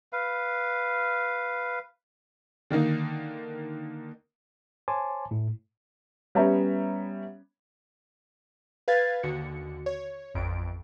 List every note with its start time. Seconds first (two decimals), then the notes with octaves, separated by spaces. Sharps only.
0.13 B4 F5
2.70 D3 D#3 A#3 D#4
4.88 C5 C#5 G#5 A5 C6 D6
5.31 A2
6.35 G3 B3 C#4 C#5 E5 A#5
8.88 B4 F5 G#6 A6
9.23 D#2 D3 F#4 C#7
9.86 C#5
10.34 A1 F2 D7